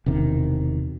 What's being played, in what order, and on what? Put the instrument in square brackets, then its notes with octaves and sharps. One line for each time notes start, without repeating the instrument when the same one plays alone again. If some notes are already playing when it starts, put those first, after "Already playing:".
[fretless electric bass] E1 C3 D#3